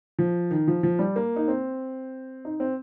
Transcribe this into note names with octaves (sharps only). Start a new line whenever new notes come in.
F3
D#3
F3
F3
G3
A#3
D#4
C4
D#4
C4